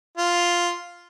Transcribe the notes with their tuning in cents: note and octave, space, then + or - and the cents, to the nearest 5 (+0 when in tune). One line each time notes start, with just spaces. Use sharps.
F4 +0